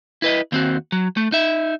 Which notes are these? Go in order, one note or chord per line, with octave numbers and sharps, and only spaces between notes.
E4 B4 D#5
D#2 C4 F#4
F#3
A3
D#4 E5